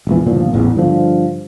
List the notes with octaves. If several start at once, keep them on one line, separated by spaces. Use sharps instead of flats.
E1 A#1 E3
G1 D#2 A#2 F3
A1 E2
G2 D3 F3